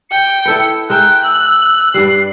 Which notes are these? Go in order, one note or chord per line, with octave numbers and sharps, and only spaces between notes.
G5 C#7
E4 A4 B4
G#3 A#4 E5 G5 F#6
E6 F#6
G2 G3 C7